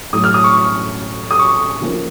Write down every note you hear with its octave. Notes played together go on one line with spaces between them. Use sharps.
A2 F#3 A3 D#6
F6
D#6
C#6
D#6
C#6
C#3 F3 A#3